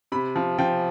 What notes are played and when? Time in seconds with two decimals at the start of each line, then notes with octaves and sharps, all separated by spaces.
0.12 C3 B5
0.36 F3
0.58 F3 G5